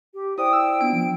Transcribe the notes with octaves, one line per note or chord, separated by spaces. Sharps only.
G4
E4 C5 D5 G5 D#6
E6
B3 D4 F4 D7
F3